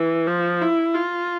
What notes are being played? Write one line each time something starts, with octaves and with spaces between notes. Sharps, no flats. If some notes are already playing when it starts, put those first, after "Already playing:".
Already playing: E3
F3
E4
F4